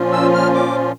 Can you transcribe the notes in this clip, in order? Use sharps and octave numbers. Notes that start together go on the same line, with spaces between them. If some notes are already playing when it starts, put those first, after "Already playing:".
Already playing: A#2 F3 C#4 F4
E6
F6
D6